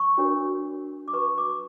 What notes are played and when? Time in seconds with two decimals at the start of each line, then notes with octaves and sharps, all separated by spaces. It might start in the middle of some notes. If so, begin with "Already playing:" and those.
Already playing: C#6
0.18 D4 F#4 A#4 C#5
1.08 D6
1.13 F#4 B4 C#6
1.38 D6